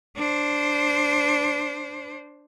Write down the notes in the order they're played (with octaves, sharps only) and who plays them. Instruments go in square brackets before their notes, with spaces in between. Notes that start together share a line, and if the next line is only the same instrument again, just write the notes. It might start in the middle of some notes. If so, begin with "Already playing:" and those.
[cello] D4 C5